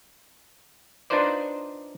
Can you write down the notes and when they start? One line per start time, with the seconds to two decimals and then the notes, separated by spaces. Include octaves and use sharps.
1.10 D4 D#4 F4 B4 C5 D5